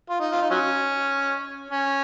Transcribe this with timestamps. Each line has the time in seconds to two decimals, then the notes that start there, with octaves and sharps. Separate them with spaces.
0.10 F4
0.20 D#4
0.32 F4
0.41 D#4
0.51 F#3 C#4
1.71 C#4